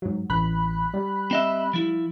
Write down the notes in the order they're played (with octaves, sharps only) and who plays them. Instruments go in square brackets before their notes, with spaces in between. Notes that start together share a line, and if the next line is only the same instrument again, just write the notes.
[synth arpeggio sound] G#2 F#3
[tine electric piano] A1 [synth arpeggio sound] B5 F#6
[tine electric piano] G3
[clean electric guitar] C4 D#5 E5
F3 E4